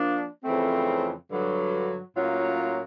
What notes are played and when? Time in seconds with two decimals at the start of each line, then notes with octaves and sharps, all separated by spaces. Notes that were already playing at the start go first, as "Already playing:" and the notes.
Already playing: F3 A#3 D4
0.44 F2 C#3 E3 A3 C4
1.31 G2 D3 F#3
2.17 A2 F#3 A#3 C#4 F4